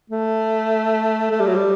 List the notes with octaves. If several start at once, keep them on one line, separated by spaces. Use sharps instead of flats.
A3
A3
G3
F#3
G3